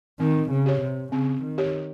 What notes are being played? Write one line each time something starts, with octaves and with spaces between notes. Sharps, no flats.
D#3 C4
C#3
G4 C#5
C3
C#3 C4
D#3
G4 C#5